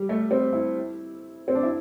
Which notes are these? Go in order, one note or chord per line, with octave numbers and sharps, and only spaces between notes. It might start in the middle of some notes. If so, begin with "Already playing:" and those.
Already playing: G3
A3
C4
E4
C4
D4
E4